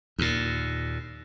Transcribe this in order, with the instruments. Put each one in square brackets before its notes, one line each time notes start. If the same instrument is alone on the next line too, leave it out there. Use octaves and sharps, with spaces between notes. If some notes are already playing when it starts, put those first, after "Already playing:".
[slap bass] D#2 A#2